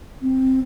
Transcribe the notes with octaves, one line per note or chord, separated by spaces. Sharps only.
C4